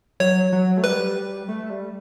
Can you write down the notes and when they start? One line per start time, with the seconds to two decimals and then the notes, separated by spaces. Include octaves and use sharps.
0.20 F#3 C#5
0.52 F#3
0.77 A3
0.84 G3 B4
1.48 A3
1.70 G3